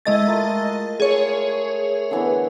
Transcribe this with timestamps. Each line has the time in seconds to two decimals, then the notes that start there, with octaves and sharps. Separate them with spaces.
0.05 G#3 A3 E4 D#5 E5 A6
0.27 A3 F4 A#4
1.00 G#4 C#5
2.11 D3 E3 B3